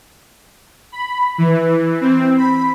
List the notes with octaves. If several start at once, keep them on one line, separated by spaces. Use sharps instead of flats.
B5
E3
C4
B5